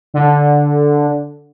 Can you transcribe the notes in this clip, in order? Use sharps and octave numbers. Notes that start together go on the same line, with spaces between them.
D3